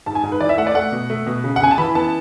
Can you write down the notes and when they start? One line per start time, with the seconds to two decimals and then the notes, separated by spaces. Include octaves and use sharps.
0.06 G#2 A5
0.15 G#5
0.23 G#2
0.32 B4
0.40 E3 D5
0.49 E5
0.58 A3 F#5
0.67 D5
0.75 A3 F#5
0.92 B2
1.10 A3
1.27 B2
1.44 C#3
1.56 F#5
1.61 C#3 G#5
1.71 A5
1.78 E3 B5
1.95 B3 A5